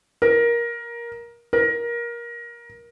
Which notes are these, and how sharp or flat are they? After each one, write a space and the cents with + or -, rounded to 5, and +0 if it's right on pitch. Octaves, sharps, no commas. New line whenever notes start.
A#4 +15
A#4 +20